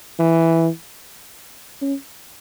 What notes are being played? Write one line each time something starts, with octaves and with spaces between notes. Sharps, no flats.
E3
C#4